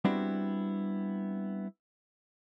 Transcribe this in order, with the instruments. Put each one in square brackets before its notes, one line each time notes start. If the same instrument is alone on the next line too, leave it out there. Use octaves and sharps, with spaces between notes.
[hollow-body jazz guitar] G3 B3 C4 D4 E4 F#4